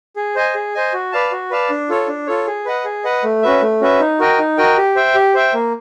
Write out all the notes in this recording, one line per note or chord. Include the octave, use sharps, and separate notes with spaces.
G#4
C5 D#5 G#5
G#4
C5 D#5 G#5
F#4
B4 D5 F5 A5
F#4
B4 D5 F5 A5
D4
F4 A4 C#5
D4
F4 A4 C#5
G#4
B4 D#5 F#5
G#4
B4 D#5 F#5
A3
C#4 F#4 B4 E5
A3
C#4 F#4 B4 E5
D#4
F#4 A#4 D#5 G5
D#4
F#4 A#4 D#5 G5
G4
C5 E5 G5
G4
C5 E5 G5
A#3